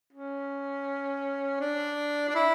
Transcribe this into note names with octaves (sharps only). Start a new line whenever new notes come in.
C#4
D4
D4
E4